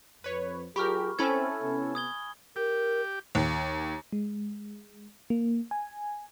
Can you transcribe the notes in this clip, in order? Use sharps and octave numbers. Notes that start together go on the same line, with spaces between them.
F2 B4 C#5
F#3 F4 G4 G#4 A#4 B5 C#6 F6
C4 C#4 E4 A4 G#5 B5 G#6
C3 B3
D#6 G#6 G7
G4 A#4
D#2
G#3
A#3
G#5